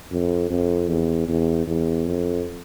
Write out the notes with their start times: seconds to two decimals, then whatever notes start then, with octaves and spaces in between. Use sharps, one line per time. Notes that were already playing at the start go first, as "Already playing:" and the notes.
0.11 F2
0.50 F2
0.89 E2
1.28 E2
1.67 E2
2.06 F2